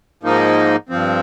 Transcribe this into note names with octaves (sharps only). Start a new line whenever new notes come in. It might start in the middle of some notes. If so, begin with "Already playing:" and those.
G#2 F3 A#3 D#4
G2 F3 C4